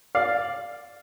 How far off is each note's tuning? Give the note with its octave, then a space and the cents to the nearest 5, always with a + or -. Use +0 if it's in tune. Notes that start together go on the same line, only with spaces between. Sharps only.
D5 +0 F5 +0